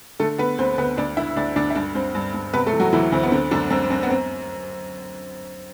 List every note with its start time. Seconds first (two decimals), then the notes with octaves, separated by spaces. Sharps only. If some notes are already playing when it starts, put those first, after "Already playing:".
0.20 D3 A3 A4
0.38 D3 B3 B4
0.58 D2 C4 C5
0.78 D2 B3 B4
0.97 D2 D4 D5
1.17 D3 E4 E5
1.36 D2 D4 D5
1.56 D2 D4 D5
1.70 E5
1.75 G2 D4 D5
1.95 G2 C4 C5
2.15 G2
2.34 G2
2.53 C3 B3 B4
2.67 A3 A4
2.73 E3
2.80 F#3 F#4
2.93 D2 E3 E4
3.12 D2 C4
3.23 B3
3.31 D3 C4
3.51 F#2 D3 D4
3.71 F#2 C4
3.90 F#2 C4
4.03 B3
4.10 C4